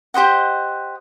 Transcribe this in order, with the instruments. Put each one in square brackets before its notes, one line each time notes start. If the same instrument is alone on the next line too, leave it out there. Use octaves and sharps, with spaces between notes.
[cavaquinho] G4 C5 D#5 F#5